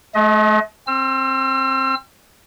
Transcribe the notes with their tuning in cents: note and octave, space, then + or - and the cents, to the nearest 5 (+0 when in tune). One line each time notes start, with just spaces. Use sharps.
A3 -35 D#5 +30
C4 +20 E6 +45